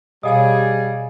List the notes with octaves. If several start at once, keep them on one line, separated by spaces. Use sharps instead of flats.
B2 G3 G#4 C#5 D#5 F5